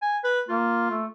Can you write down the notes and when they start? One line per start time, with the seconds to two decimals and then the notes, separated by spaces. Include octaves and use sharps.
0.02 G#5
0.24 B4
0.48 A#3 F4
0.90 A3